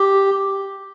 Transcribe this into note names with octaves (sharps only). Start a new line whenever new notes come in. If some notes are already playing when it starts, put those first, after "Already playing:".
Already playing: G4